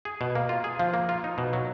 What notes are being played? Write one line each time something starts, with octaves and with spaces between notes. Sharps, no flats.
G#4
B2
A#3
F4
G#4
F3
A#3
F4
D#4
B2
F#3